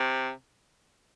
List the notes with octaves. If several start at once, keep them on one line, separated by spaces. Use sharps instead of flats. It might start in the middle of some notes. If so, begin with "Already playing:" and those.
Already playing: C3